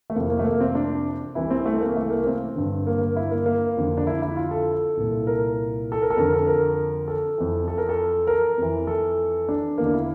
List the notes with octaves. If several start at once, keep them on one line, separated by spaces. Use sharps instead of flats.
A3
F2 C3 E3 A#3
A#3
A3
A#3
C4
D4
C2 C3 E3 E4
C4
A3
A#3
A3
A#3
A#3
C4
G2 D3
A#3
A#3
E4
A#3
A#3
F2 D3
D4
E4
E4
F4
A4
C2 A#2
A#4
A4
A#4
A4
F2 D3 A#4
A4
A#4
A4
F2 E3
A4
A#4
A4
A#4
F2 E3
A4
D4
E2 D3 A#3
D4
E4